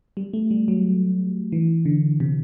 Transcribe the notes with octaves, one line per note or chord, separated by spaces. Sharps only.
G3
A3
G3
F#3
E3
D3
C3